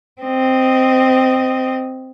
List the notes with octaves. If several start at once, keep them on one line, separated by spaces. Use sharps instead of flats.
C4 D#5